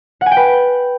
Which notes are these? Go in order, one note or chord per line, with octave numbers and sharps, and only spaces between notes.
F#5
G#5
G5
B4